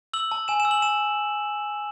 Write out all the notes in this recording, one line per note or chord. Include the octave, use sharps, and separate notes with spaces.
E6 F#7
A5
G#5 E7
E7
E6
F#7
A5 E7